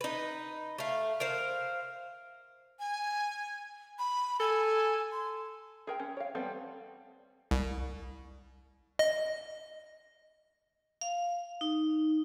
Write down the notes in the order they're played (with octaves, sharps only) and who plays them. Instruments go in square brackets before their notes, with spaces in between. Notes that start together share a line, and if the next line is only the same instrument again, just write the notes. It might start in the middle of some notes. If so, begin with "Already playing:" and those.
[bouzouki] D#4 B4
A3 F5
A#4 C5 F5
[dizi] G#5
B5
[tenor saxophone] A4 [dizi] G#5
[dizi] C6
[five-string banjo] G#4 A#4 G5
C#4
C#5 F5
G3 B3 C4 A4
[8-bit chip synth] C2
D#5
[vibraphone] F5
D#4